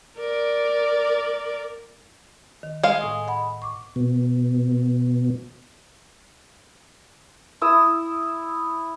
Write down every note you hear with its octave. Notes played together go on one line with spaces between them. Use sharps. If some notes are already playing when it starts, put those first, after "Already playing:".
A#4 D5
D#3
G#3 F5
A2 G#5 D#6
D#5 F#5 B5
C#6 D6
B2
E4 D#6 E6